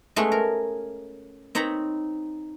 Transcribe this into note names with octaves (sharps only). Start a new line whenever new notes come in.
G#3 A3 B3 C#4 G#4
A#4
C4 D#4 C#5 A#5 B5